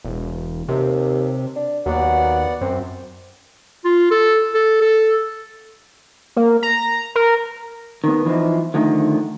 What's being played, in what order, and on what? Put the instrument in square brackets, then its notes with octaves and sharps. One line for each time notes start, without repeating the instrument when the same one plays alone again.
[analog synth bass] E1
[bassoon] D#2 [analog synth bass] C3
[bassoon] D4
[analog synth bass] D#2 [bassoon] F#3 [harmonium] B3 D5 F#5
[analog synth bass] F#2 [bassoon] C4
[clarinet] F4
A4
A4
A4
[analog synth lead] A#3
A#5
A#4
[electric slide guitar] D#3 B3
E3 F3 D#4 E4
D3 D#3 F3 A3